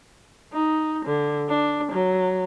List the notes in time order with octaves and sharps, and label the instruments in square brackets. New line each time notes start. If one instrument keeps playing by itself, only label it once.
[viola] D#4
D3
D4
F#3